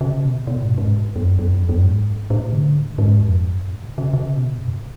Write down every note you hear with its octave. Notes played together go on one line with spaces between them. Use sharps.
C#3
B2
B2
G#2
G#2
F#2
F#2
F2
F#2
G#2
A2
D3
G#2
F2
F#2
A2
C#3
C#3
C#3
B2
F#2
G#2